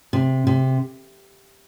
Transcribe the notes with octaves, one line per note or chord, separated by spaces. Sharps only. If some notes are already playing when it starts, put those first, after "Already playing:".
C3
C3